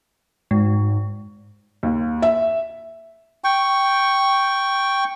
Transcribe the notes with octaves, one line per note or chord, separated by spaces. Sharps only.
G#2 G#3
D#2
E5
G5 C#6